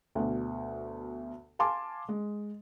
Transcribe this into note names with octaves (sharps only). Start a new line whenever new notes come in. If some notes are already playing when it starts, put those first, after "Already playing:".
D2 B2
F5 G#5 A5 C6 D6
G#3